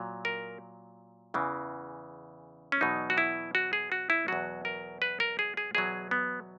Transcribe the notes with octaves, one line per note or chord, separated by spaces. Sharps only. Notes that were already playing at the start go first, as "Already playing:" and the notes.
Already playing: A#2 F#3
A#4
E2 C#3 E3
C#4
E2 B2 F#3 D#4
F#4
E4
F#4
G#4
F#4
E4
E2 B2 F#3 F#4
A#4
B4
A#4
G#4
G#4
E2 B2 F#3 G#4
B3